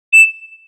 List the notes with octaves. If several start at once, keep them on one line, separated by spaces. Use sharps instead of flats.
E7